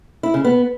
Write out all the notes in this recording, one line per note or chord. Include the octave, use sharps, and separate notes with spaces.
E4
C#3
B3